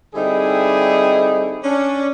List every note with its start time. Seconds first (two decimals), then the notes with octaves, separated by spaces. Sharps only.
0.15 D3 G3 C4 D#4 E4 G#4
1.64 C#4 D4